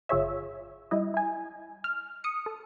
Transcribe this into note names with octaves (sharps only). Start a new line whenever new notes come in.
G1 F4 G#4 C#5 E5
G3 E4 D#5
E4 G#5
F6
D#6 C#7
A4